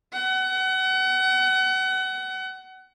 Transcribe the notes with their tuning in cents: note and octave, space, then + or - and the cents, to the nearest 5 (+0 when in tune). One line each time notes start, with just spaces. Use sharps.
F#5 +30